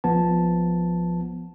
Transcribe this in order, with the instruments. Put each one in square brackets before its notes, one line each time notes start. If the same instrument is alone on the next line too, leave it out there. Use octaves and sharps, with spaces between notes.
[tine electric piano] A#1 F3 B3 A5